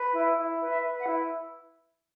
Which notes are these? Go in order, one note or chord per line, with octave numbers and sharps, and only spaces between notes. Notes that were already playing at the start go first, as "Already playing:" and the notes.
Already playing: B4
E4
E4
B4
E5
B4
F#5
E4